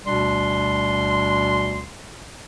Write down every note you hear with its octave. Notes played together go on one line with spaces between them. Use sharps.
D2 B2 G3 D4 C6